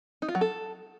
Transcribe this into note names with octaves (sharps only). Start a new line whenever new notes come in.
D#4
F4
F#3
A4